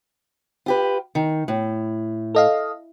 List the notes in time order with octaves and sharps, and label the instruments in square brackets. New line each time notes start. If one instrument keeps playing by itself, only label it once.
[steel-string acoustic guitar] F4 G4 B4
D#3
A2
[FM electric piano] A4 D#5 F5